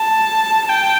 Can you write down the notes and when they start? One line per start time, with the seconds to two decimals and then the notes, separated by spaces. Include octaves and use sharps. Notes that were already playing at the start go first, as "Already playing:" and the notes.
Already playing: A5
0.69 G5